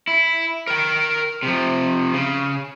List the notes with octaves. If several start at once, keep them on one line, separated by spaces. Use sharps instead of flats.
E4
A#4 G5
C3 F3
C#3